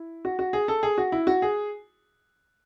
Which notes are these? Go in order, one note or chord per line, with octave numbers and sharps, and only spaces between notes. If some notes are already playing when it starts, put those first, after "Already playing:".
Already playing: E4
F#4
F#4
G#4
A4
G#4
F#4
E4
F#4
G#4